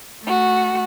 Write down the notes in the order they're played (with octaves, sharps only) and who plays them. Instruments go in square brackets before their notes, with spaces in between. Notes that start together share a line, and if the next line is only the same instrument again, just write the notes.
[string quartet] A3 F#4